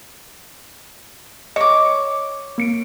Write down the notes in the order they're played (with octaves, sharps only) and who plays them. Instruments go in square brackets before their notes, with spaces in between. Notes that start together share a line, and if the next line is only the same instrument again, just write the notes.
[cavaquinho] C#5 D6 [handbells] D#5
[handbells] A#3 C#7 D7